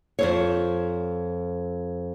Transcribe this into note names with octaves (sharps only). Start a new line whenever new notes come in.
F2 C5 C#5